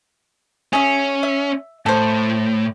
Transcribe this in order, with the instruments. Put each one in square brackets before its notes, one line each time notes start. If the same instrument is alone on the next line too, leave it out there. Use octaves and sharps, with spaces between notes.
[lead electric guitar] C#4 [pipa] G#4 E5
[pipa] E5
[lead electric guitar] A2 [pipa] A4 C5